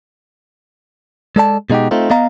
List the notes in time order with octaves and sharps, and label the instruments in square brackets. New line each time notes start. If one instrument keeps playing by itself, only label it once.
[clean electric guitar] G#3 A4 D5 A5
B2 G#3 D#4 F#4 G4
A3 C4 D#4 F4
B3 D#5 F5 A#5